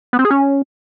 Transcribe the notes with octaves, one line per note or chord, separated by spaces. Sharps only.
B3
C4
G#4
C#4